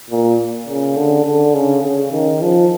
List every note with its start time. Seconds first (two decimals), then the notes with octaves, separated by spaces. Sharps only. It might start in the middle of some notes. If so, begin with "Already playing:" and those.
0.10 A#2
0.68 C#3
0.97 D3
1.25 D3
1.55 C#3
1.83 C#3
2.12 D#3
2.42 F3